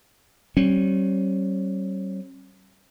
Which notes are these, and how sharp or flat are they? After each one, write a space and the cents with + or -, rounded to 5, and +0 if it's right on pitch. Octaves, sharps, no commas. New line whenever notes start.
G3 -40 C#4 -40